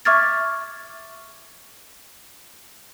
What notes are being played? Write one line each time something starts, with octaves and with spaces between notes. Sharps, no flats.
E5 C#6 D6 F6 G#6 A6